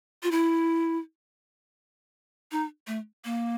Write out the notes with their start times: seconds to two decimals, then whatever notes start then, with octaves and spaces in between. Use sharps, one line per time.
0.23 F4
0.31 E4
2.51 D#4
2.87 A3
3.25 A#3